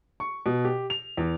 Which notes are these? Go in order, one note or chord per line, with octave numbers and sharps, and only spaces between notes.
C#6
B2
G4
F7
E2